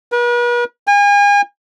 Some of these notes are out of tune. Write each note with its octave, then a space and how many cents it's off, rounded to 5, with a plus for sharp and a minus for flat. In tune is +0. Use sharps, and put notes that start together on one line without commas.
B4 -45
G#5 -40